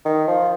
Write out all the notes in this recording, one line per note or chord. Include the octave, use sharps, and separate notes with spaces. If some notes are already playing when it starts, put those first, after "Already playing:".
D#3
F3